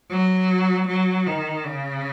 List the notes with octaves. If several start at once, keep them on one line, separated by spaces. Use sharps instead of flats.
F#3
F#3
D#3
C#3